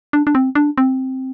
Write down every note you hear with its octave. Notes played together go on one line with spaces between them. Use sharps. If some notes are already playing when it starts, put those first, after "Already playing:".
D4
D4
C4
D4
C4